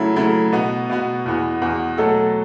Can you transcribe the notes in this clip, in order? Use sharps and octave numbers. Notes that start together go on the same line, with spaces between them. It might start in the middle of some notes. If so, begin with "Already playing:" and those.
Already playing: C#3 F#3 A3 E4
C#3 F#3 A3 E4
B2 B3 F#4
B2 B3 F#4
E2 E3 B3 F#4
E2 E3 B3 F#4
B2 F#3 A3 F#4 A4